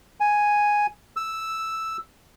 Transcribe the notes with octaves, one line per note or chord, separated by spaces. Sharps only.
G#5
E6